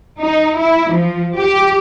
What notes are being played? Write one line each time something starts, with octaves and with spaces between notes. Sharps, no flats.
D#4
E4
F3
G4